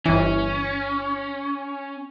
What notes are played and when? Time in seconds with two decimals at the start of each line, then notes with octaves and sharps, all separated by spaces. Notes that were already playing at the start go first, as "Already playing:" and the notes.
0.05 G1 E3 C#4